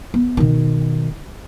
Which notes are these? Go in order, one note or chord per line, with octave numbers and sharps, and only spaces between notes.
B3
B2 D#3